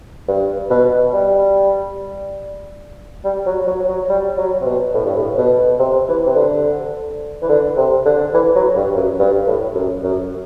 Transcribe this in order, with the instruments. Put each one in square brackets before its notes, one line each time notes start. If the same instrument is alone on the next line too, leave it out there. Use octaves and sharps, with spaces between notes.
[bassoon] G2
B2
G3
G3
F#3
F#3
F#3
G3
F#3
C3
B2
A2
G2
A2
B2
C3
E3
C3
D3
E3
D3
C3
D3
E3
F#3
G2
F#2
G2
A2
F#2
F#2